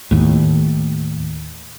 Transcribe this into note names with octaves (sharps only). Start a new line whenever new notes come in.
D#2 A2